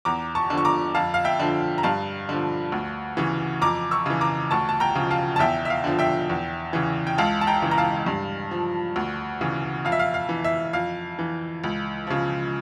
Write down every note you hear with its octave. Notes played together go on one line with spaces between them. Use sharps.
E2 A#5 D6
A5 C#6
D3 F3
C#6
A#5 D6
F2 F5 A5
F5
E5 G5
D3 F3
A#5
G2 F5 A5
D3 F3
D2
C#3 E3
F2 A#5 D6
C#6 E6
C#3 E3
A#5 D6
D2 A5 C#6
A5
G5 A#5
C#3 F3
F5 A5
A5
E2 E5 G5
E5
F5
D3 F3
E5 G5
E2
C#3 E3
G5
C#2 F5 A5
A5
G5 A#5
C#3 E3
A#5
F5 A5
G2
F3
D2
C#3 E3
F2 F5
E5
F5
F5
E3
E5
F2 F5
E3
C#2
C#3 F3